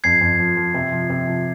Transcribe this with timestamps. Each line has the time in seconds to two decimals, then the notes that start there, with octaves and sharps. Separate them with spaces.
0.04 F2 G#6 C7
0.21 F2
0.40 F3
0.57 F3
0.74 C3
0.92 F3
1.09 C3
1.27 F3